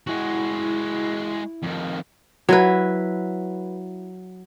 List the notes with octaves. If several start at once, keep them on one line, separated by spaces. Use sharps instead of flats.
G#3 E4 F#4
F2 D#3
F#3 E4 B4